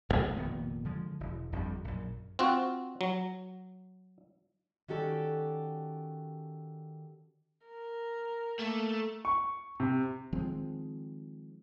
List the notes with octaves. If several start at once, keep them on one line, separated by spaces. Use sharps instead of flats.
D1 G#1
F1 A#2 D#3 B3
D3 F3 G#3
E1
G1 F2 C#3 G3
A#1 F#2
C4 F4 F#4
F#3
D#3 C#4 F#4 G4 A4 D5
A#4
A3 A#3
C#6
C3
D#3 F3 G#3 C4